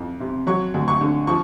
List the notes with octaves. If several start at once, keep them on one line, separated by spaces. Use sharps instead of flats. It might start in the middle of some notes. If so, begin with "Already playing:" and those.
Already playing: F2 E3
C3
F#3 C#6
D2
C#6
D3
F3 C#6